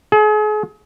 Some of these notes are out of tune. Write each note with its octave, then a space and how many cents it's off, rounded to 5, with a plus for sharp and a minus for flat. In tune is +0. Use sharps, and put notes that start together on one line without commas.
G#4 +40